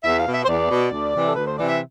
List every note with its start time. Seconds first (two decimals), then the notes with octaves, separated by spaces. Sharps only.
0.04 E2 E5
0.19 F5
0.26 B2
0.34 E5
0.44 C5
0.48 E2 D5
0.70 B2
0.92 D2
1.15 C3 E3
1.28 A4
1.36 D2 B4
1.47 C5
1.58 C3 E3 D5
1.68 E5